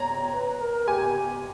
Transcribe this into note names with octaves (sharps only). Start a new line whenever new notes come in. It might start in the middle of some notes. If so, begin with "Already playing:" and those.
Already playing: C#5 A#5
B4
A#4
G4 G#5